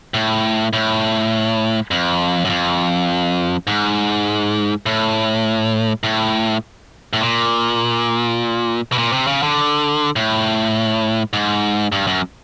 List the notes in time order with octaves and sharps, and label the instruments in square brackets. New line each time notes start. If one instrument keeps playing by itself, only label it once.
[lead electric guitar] A2
A2
F2
F#2
F2
G#2
A2
A2
A2
A#2
B2
A#2
C3
C#3
D3
A2
G#2
G2
F#2